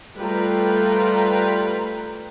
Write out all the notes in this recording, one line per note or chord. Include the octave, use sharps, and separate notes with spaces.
G3 A3 F4 B4 G5 A#5